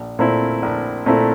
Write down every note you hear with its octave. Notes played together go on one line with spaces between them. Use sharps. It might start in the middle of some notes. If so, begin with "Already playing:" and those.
Already playing: A#1
A#2 A3 C4 E4
A#1
A#2 A3 C4 E4